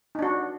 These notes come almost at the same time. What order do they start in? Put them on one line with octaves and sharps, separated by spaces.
D#4 D4 F#4